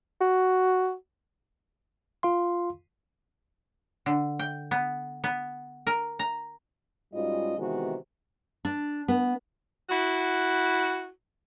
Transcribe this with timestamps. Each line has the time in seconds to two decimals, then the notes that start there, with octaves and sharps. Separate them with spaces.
0.21 F#4
2.23 F4 F5 C6
4.06 D3
4.39 G5
4.71 B3
5.24 B3
5.87 A#4
6.19 A#5
7.13 G#2 G3 C#4 F4 F#4 D#5
7.58 C3 D#3 E3 G#3 B3 F#4
8.65 D4
9.08 B3
9.89 E4 F#4